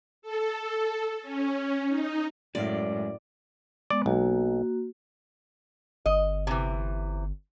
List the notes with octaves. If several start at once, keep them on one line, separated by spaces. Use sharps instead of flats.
A4
C#4
D#4
F#2 A2 G#3 D5 F5
G#3 B3 D5
B1 A#3 F#4
G1 D#5
C3 E3